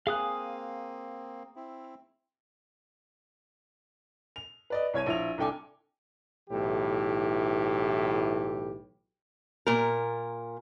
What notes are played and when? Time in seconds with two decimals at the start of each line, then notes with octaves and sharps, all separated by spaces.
0.07 A#3 C4 G#4 F5 D#6 F#6
1.56 C4 E4
4.36 F7
4.70 B4 D5 D#5
4.94 C2 C#5 G#6 D#7
5.06 A#1 E4 F7
5.38 C2 D4 A4 G5 G#5 D6
6.50 B1 A2 E3 G4
9.67 A#2 A#4